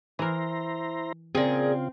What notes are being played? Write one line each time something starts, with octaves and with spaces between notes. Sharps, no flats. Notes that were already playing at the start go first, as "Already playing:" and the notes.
E3 E4 A#4 C5 A#5
A#2 C#3 C4 F4 G#4